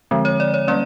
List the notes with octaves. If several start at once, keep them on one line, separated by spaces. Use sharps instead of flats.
D3 F3 G#3 C4
C#5
D5
C#5
G3 A#3 C#4 D5